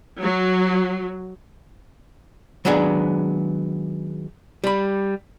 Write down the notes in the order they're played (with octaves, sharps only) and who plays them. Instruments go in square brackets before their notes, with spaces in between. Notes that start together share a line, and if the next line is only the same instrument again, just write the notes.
[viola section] F#3
[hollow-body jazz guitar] D#3 F#3 G#3 B3 D4 G#4
G3 B5